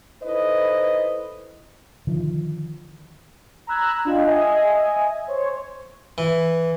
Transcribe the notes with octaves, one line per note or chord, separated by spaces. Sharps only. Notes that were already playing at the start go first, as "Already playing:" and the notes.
D#4 E4 A4 B4 C5 D#5
D3 D#3 F3
A#5 B5 E6 F#6 G#6
D4 F4 D#5 G5
D#5 E5 G#5
C5 C#5
E3